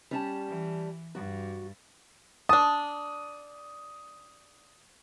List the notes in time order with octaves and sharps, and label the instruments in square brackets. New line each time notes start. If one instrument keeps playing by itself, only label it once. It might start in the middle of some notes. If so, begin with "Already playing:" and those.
[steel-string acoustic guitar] G3 C#4 A5
[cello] E3
[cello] G2 [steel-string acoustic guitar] F#4
[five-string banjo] D4 A5 [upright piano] D#6